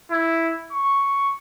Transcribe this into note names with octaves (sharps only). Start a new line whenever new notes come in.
E4
C#6